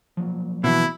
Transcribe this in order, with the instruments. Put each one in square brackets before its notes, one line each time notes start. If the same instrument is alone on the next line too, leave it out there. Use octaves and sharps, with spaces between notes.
[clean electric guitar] F3 F#3 A#3
[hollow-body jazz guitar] B2 E3 [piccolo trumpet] E4